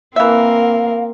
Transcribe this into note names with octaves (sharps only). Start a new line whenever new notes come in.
E3 A#3 C4 A#4 E5 F5